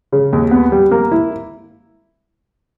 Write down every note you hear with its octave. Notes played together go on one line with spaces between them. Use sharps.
C#3
D#2
B3
G3
A#3
E4